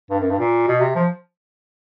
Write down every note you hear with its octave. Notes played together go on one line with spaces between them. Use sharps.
G2
F#2
G2
A#2
B2
C3
F3